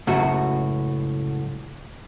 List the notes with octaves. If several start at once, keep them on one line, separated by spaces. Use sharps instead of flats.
C#2 F#2 A2 F#4